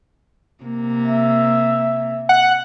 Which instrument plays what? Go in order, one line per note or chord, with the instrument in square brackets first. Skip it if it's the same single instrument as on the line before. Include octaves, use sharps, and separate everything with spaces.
[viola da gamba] C3 A#3
[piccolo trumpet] E5
[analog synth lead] F#5